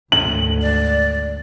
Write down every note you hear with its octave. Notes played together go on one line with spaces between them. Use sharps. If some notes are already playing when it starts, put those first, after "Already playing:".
G#1 D2 F#7
D5